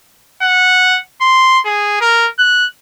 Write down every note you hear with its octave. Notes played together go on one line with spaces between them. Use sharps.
F#5
C6
G#4
A#4
F#6